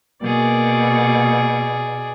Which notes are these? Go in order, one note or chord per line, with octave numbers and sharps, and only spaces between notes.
B2 A#3 G#4 D5